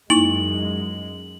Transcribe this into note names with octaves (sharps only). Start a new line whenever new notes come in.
F#2 G#3 A#3 D#4 E4 F#7